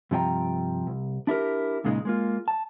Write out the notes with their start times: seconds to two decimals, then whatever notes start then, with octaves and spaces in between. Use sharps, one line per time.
0.11 G2 C3 F3 D#5 G5 A#5
0.87 C2
1.27 D4 E4 G4 A#4
1.84 E2 A#2 C#3 G#3 B3 D#4
2.05 G#3 A#3 F4
2.48 A5